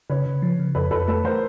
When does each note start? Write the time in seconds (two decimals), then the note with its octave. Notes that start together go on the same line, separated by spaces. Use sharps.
0.10 C#3 B4 C#5
0.27 C#3
0.42 F3
0.59 C#3
0.75 F2 A4 B4
0.91 F2 A4 B4
1.08 A3 A4 B4
1.24 E3 A#4 C5